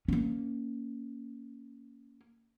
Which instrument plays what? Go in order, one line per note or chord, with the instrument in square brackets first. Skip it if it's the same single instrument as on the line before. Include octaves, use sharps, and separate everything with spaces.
[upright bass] A#3 C#4